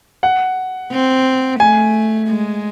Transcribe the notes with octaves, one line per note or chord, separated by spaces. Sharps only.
F#5
C4
A3 G#5
G#3